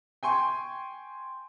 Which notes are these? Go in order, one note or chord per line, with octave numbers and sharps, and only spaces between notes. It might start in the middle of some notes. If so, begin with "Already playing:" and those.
G5 G#5 C6 C#6